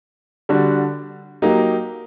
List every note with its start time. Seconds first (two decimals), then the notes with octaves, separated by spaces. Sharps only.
0.49 D3 G3 D4 F#4
1.42 F#3 A#3 D#4 G4